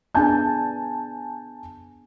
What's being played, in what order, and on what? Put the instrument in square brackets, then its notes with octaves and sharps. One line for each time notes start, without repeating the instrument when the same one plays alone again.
[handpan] B3 D4 G#4 [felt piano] G#5 A5 G6